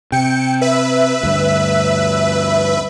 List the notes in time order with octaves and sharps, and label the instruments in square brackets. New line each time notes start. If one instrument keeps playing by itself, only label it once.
[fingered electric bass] C3 [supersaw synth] G5 C#7
[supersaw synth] B4 E5
[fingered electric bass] D2 G2